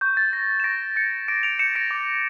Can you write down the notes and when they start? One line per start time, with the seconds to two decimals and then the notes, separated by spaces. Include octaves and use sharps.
0.01 C#6 G6
0.17 A6
0.33 G6 A#6
0.60 E7
0.64 C#6 A#6 D7
0.96 G6 A6 C#7
1.28 D6 A#6 D7
1.43 D7 F7
1.59 G6 C#7 E7
1.75 A#6 D7
1.91 D6